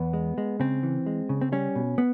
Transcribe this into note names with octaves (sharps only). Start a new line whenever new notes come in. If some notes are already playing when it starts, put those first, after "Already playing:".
Already playing: E2 B3
G#3
G#3
C#3 C4
E3
G#3
C#3
C4
G3 C#4
B2
B3